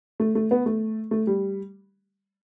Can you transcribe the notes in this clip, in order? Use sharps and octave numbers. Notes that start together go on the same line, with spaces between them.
A3
A3
B3
A3
A3
G3